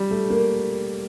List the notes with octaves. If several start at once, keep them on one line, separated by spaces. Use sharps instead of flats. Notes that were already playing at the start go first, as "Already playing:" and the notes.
Already playing: G3
A3
A#3